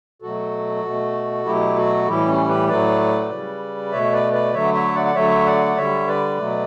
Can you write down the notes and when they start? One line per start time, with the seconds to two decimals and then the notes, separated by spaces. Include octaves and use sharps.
0.22 B2 F#3 A3 F#4 A4
0.84 B2 A3
1.45 B2 F#3 A3 E4 G4
1.76 F#4 A4
2.07 A2 E3 G3 E4 G4
2.27 C#4
2.48 G4 B4
2.68 A2 F#3 A3 B4 D5
3.30 C#3 G3
3.92 B2 A3 C#5 E5
4.13 B4 D5
4.33 B4 D5
4.53 D3 F#3 A3 C#5 E5
4.74 C#5 E5
4.95 D5 F#5
5.05 F#5
5.15 D3 F#3 A3 C#5 E5
5.45 D5 F#5
5.77 D3 G3 C#5 E5
6.08 B4 D5
6.38 B2 F#3 A3